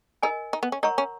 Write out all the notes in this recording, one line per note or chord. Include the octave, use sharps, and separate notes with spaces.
D#4 A#4 D#5 G#5
D#4
B3
C#4
D#4 A#4 C#5 F#5 A#5 C#6
C#4